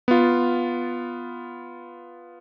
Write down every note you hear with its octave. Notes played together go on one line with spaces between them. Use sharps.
B3 F4